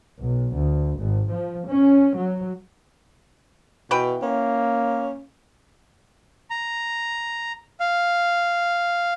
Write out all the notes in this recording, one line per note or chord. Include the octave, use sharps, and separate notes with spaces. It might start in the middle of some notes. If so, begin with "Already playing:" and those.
B1
D2
G#1
F3
C#4
F#3
B2 E3 B4 G5
A#3 C#4
A#5
F5